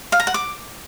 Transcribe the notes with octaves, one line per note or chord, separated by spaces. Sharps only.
F5
A#5
F#5
D6